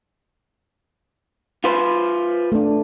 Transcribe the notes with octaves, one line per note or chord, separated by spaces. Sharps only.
F4 B4 C5
A3 D4